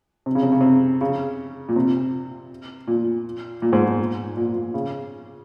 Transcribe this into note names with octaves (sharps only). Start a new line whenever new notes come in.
C3
C#3
C3
C#3
C3
C#3
A#2
C3
A#2
A#2
G#2
A#2
A#2
A#2
C#3